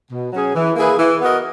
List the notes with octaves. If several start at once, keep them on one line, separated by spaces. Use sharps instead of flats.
B2
F#3 C#4 G#4
E3
A#3 E4 G#4 B4
E3
B3 F#4 A#4 D#5